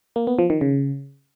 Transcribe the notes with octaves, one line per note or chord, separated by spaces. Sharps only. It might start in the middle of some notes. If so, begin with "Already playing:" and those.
A#3
B3
F3
D#3
C#3